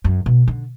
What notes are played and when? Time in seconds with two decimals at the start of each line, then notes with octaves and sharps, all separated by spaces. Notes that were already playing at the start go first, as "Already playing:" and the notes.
0.04 F#2
0.26 B2
0.48 D3